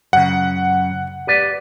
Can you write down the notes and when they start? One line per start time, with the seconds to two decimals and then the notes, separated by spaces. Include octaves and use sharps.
0.13 F#2 C#3 F#5
1.27 G4 B4 D5